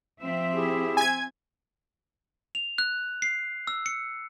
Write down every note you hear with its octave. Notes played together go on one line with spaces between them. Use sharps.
F3 C4 E5
E4 G4 G#4
G#5 G#6
F7
F#6
C7
E6
C#7